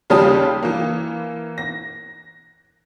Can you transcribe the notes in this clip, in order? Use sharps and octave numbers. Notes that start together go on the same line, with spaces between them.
D#2 C#3 G3 C#4 A5 D#6
E3 A#3
A#6